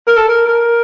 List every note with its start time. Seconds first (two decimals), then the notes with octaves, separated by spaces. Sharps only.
0.07 A#4
0.17 A4
0.28 A#4
0.47 A#4